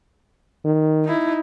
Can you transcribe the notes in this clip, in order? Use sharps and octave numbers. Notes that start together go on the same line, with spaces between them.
D#3
D#4 E4